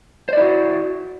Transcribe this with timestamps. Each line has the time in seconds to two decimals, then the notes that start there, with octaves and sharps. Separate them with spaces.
0.29 C5
0.33 D5
0.37 E4
0.41 F#4